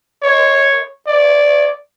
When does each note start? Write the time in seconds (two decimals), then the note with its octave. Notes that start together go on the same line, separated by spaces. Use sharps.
0.22 C#5
1.07 D5